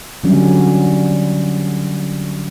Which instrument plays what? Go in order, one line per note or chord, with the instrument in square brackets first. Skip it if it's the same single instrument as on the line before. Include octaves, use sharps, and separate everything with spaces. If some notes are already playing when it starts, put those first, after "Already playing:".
[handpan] D3 F#3 G3 C#4